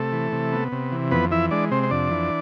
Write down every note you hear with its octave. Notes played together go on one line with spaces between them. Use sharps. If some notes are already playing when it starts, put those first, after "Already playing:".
Already playing: C3 A3 A4
E3
C3
B3
C3
E3
F2 B3 B4
E3 E4 E5
G#3 D4 D5
C3 C4 C5
C5
F2 D4 D5
E3